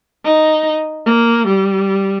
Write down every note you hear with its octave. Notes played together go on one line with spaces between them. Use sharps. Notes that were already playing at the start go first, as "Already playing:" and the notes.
D#4
A#3
G3